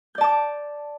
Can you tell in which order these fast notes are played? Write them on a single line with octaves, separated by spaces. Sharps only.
G6 D5 A5 D6